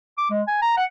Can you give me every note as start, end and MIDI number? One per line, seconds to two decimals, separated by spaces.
0.18 0.30 86
0.31 0.42 56
0.47 0.58 80
0.62 0.76 82
0.77 0.84 78